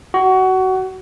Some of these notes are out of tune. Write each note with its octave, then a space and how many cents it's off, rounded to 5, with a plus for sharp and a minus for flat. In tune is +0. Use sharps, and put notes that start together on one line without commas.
F#4 +20